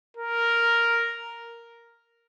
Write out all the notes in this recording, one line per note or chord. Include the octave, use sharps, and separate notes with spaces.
A#4